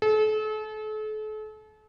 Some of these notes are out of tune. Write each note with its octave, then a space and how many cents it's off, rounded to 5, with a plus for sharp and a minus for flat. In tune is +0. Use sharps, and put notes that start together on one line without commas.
A4 -40